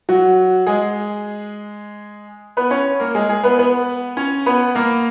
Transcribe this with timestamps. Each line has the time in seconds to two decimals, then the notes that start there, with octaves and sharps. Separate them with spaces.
0.09 F#3 F#4
0.67 G#3 G#4
2.57 B3 B4
2.71 C#4 C#5
3.00 A#3 A#4
3.14 G#3 G#4
3.29 G#3 G#4
3.43 B3 B4
3.59 B3 B4
4.17 C#4 C#5
4.46 B3 B4
4.75 A#3 A#4